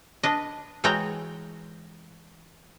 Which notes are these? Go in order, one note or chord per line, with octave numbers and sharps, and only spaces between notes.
D4 B4 D#5
E3 G#3 F#4 C#5 G5 A#5